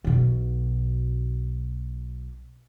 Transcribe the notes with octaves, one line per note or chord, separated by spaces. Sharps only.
B1 B2